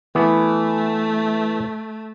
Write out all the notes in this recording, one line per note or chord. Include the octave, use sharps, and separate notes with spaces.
E3 A3 B3